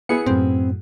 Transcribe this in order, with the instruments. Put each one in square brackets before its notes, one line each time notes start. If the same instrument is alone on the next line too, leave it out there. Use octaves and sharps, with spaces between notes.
[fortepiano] B3 E4 G#4 [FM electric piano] C#7
[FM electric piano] F#2 A2 [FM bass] C4